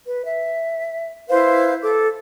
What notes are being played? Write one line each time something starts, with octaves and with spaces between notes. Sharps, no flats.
B4
E5
E4 B4 C5 F5
A4 D6